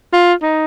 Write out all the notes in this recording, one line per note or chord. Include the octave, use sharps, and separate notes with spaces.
F4
D#4